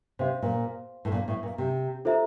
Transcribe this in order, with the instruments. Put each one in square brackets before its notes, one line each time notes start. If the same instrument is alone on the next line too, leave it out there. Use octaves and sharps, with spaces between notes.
[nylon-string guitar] C3 [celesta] C5 F5 C6
[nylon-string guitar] A#2
A2
A#2
A2
A#2
C3
[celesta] F4 A4 C5 E5 A#5